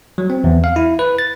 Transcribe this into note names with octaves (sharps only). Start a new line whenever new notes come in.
F#3
C4
E2
F5
E4
B4
A6